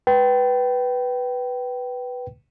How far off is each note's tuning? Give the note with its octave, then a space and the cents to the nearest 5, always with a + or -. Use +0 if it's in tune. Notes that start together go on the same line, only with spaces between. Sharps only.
B4 +0 G5 -20